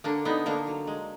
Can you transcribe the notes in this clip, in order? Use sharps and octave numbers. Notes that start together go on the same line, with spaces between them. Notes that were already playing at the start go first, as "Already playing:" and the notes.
D3 A#3 D4
D3 B3 D#4
D3 A#3 D4
F#3
G#3